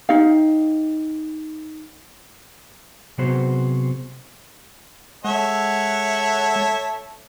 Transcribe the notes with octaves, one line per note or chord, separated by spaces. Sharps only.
D#4 G4 F5
C3 F#3 B3 F#4 G#4 C5
G#3 A4 C#5 E5 F#5